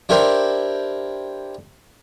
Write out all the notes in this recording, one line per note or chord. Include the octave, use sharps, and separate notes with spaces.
D4 E4 G4 A#4 C5